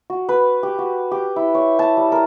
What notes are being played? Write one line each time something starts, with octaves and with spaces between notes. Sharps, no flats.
F#4
B4
G4
F#4
G4
E4
C#5
A5
G3
A#4